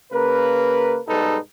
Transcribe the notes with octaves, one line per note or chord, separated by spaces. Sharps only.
C#3 A#3 A#4 B4
B1 G#2 G3 D#4 A4 B4